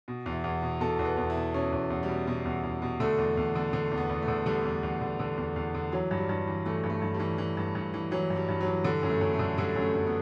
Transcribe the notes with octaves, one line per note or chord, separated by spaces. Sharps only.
B2
E2
E4
E2
B2
B2 A4
E2
B4
E2
E4
B2
B2 C#4
E2
E2
G3
B2
B2
E2
E2
B2
D3 A3
E2
E2
D3
D3
E2
B3
E2
A3
D3
D3 G3
E2
E2
D3
D3
E2
E2
D3
E3 F#3
G2
G3
G2
E3
E3 A3
G2
A3
G2
G3
E3
E3
G2
G2
E3
E3 F#3
G2
G3
G2
F#3
E3
D3 G3
F#2
A3
F#2
A3
D3
D3 G3
F#2
A3
F#2
B3